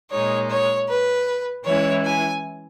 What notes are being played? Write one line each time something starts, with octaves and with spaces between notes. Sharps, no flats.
A#2 G#3 D#4 C#5
C#5
B4
E3 G#3 C#4 E4 C#5
G#5